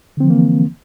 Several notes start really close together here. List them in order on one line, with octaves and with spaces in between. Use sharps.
D3 C4 F3 E3 A#3